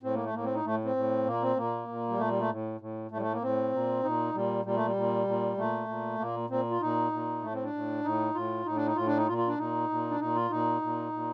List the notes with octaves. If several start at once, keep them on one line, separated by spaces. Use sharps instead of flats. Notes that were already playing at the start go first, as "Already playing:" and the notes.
A2 C4
A#3
A3
A2 A#3
C4
D#4
A2 A3
C4
A2
A#2 A#3
C4
A#2 A#3
A#2
G3
A#2 A3
G3
A3
A2
A2
A2 A3
G3
A3
A#3
A2 C4
A#2
A#2 D#4
A#2 G3
A#2 G3
A3
G3
A#2
A#2
A#2 A3
A#2
A#2 A#3
A#2 C4
F4
A#2 D#4
A#2
A2 A3
C4
D4
A2
A2 D#4
A2 F4
A2 D#4
D4
D#4
A2 F4
D4
D#4
A#2 F4
F4
D4
A#2 D#4
A#2
D4
A#2 D#4
F4
A#2 D#4
A#2
A#2